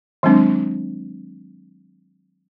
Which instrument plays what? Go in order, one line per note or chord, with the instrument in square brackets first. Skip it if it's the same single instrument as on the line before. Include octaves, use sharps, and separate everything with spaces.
[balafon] D#3 F#3 G#3 C4 D4